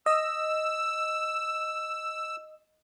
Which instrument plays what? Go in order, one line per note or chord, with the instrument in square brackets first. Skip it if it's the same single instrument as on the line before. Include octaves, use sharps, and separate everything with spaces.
[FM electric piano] D#5 [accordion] E6